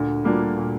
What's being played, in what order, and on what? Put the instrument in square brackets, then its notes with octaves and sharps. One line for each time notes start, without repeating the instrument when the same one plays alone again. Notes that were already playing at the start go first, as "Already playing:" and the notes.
Already playing: [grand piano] D2 D3 [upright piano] A#2
[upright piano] G3 A#3 D4 F4
A#2